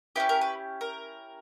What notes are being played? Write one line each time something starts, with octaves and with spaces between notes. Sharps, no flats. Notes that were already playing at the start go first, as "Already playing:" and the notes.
C#4 E4 G4 B4
A#4
B4
A#4